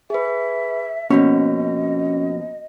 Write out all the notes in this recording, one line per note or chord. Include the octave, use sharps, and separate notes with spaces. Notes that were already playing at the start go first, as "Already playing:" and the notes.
G#4 B4 E5
F2 G#2 B2 A#3 C#4 F#4 D#5